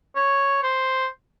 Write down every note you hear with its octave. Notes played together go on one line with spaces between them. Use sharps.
C#5
C5